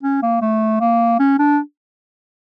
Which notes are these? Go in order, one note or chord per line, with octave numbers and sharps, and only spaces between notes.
C#4
A#3
A3
A#3
C#4
D4